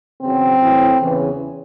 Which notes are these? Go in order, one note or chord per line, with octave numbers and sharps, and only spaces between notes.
E2 C#3 F#3 C4
A2 E3
E2 C#3 E3